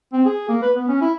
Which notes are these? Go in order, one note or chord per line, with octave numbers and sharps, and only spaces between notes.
C4
G#4
A#3
B4
B3
C#4
E4